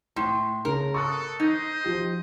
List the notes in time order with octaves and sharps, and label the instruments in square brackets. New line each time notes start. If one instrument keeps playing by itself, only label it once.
[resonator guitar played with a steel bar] A2 [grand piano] C6
[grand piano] C#3 [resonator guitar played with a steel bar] A#4
[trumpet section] A4 [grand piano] C#6 D#6 F#6
[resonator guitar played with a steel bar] D#4 [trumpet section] C5 D#5
[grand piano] F3 G4